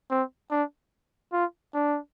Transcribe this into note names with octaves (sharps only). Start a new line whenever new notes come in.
C4
D4
F4
D4